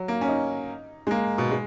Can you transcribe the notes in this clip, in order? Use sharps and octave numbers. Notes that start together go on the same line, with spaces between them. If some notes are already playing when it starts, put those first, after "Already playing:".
Already playing: F#3
A#3
C#4
D#4
G#3
A#3
B2
G#3